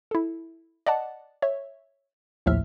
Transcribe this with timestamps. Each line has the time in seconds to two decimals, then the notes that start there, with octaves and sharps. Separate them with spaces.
0.11 E4 A4
0.86 D5 D#5 F#5 A5
1.42 C#5 E5
2.46 A#1 D#2 A2 F3 E5 F6